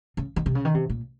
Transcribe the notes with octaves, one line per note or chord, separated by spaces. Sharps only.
C#3
D#3
C3
C#3
D#3
C3
A#2